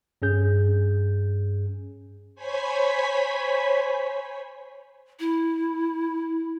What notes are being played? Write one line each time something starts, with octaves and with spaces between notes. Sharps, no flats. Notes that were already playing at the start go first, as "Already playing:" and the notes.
G2 C#4 G#4 G6
C5 C#5 G#5 B5 G#6 B6
E4